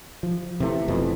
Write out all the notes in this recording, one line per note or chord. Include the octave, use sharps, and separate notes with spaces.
F3
C3 E3 A3
F1 F2 B2 E3